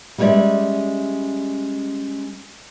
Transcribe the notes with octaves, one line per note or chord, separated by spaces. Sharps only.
G3 G#3 C#4 C#5 D5 E5